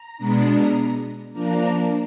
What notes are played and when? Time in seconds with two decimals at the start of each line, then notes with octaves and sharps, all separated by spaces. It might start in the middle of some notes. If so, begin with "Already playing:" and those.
Already playing: A#5
0.17 B2 G#3 B3 D4
1.33 F3 A#3 D4 A#5